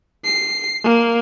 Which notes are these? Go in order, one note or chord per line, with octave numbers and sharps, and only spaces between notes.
C7
A#3